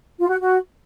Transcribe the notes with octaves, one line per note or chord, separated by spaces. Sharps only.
F4
F#4
F#4